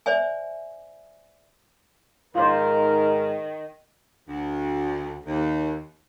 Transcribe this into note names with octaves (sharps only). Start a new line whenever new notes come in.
C5 D5 E5 G#5
G#2 D#3 F4 A#4 C5
D2
D#2